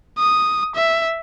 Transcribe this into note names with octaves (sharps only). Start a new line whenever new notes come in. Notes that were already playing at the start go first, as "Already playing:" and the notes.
D#6
E5